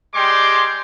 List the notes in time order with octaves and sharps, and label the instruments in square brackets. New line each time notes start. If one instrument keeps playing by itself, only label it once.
[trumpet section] G3 G#3 G4 C6 D6